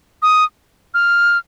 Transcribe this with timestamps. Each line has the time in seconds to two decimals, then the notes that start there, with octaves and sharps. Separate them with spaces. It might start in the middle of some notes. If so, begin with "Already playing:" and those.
0.22 D#6
0.94 F6